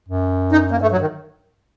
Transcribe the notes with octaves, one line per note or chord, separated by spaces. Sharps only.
F#2
D#4
A#3
G2 A3
F#3
G2
D#3